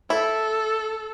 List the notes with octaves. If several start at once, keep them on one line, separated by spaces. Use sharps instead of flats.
E4 A4